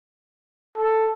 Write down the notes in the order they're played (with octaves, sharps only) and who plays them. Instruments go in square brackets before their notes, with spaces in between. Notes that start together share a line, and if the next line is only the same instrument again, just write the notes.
[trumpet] A4